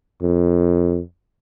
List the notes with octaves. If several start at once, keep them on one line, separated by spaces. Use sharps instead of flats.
F2